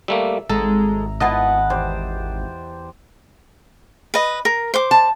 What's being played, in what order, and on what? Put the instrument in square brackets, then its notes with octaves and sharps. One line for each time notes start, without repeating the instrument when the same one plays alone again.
[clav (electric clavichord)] G3 A3 A#3 [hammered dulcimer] E5
[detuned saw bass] G#1 [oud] G#3 [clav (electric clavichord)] A4 [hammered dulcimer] A#5
[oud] B3 E4 F4 [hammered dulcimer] B4 F#5 A5 [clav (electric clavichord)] D#5
[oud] E2 [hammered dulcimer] G4 C5
[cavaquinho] B4 D#5
A#4
C5 D6
[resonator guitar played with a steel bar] A5